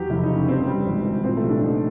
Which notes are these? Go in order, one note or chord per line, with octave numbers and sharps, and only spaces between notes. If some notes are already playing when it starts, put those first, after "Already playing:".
Already playing: E2 F#3 G4
F1 E4
D#4
C#3
C#4
G2 C4
G3
G#1
E3
A#2 C4
A3
C2
D4
C2 D#4